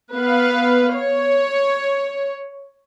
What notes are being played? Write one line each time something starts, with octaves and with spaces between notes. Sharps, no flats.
B3 B4 F5
C#5